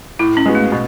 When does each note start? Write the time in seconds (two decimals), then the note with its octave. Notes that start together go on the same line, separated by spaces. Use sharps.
0.19 A2 E4
0.37 C#4
0.46 G#3 B3 F#4
0.55 A3
0.72 B2